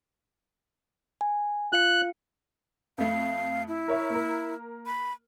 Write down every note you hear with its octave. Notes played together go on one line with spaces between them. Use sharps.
G#5
F4 F5 F#6 C#7
F2 A3 F5
E4
A#4 C#5 E5
A#3 A#4
B5